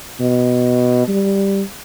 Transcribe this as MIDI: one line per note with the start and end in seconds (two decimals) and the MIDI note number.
0.20 1.04 47
1.08 1.63 55